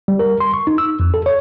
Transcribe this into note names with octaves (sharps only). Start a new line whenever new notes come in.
G3
A#4
C6
C#6
D#4
E6
F2
A4
C#5